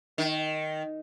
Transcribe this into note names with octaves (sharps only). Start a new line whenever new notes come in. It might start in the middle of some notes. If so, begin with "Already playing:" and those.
D#3